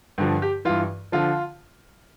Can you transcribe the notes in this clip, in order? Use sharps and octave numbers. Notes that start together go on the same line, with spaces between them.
G2 D3 F3
G4
G2 E3 F4
D3 F3 F4